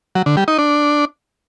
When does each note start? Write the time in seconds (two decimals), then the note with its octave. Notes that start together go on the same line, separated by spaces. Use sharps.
0.15 F#3
0.26 D3
0.37 G3
0.48 D#4
0.58 D4